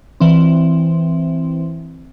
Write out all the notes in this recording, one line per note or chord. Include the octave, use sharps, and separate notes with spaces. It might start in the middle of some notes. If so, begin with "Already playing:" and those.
E3 C4